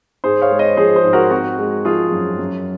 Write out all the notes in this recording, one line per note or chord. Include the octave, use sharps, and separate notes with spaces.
G#2 G#4 C5
C#5 F5
G#3
C5 D#5
F3 G#4 C5
G#4 C5
G#2
F#4 A#4
C4 F#4
G#3
F3 F4 G#4
F#2
F#2